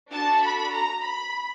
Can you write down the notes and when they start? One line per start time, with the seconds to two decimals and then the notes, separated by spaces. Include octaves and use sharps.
0.11 D4 F#4 A4 A5
0.42 B5
0.72 A#5
1.03 B5